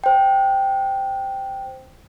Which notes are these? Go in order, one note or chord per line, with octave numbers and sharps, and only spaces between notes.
C5 G5